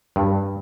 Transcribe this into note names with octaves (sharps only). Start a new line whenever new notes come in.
G2